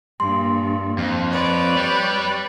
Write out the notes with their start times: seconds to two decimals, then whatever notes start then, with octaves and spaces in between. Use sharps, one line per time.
0.20 G2 A#2 C6
0.98 F2
1.29 B4 C#5 D5
1.77 G3